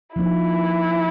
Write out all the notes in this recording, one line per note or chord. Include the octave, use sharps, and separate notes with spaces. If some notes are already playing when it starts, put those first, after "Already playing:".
F3 A#3 D#4 E4